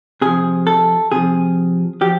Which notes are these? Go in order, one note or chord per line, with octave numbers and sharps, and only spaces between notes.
C3 F3 G#4
A4
C3 F3 G#4
F3 G4